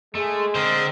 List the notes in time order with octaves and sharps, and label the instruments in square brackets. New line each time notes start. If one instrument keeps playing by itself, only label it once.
[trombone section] G#3 [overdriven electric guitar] A3
[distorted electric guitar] D3 [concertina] C4 A#4 D#6 [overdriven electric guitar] C5